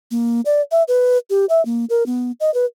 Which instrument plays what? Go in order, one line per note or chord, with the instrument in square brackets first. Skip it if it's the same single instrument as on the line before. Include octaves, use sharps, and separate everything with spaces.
[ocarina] A#3
D5
E5
B4
G4
E5
A#3
A#4
B3
D#5
B4